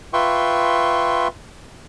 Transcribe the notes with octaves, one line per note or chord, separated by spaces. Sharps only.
F4 B4 E5 G5 C6 C#6